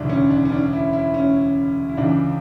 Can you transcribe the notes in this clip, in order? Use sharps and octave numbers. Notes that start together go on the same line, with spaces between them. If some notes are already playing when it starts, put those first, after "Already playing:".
Already playing: E1 D2 C#3 G3 D4 E4
C#4
D4
C#4
D4
E4
E4
C#4
E4
C#2 C#3 E3 D4